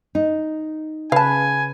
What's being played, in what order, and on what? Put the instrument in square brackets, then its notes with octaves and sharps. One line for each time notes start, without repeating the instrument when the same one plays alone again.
[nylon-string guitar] D#4
[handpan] C#3 B4 [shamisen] F5 A5 [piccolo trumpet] G#5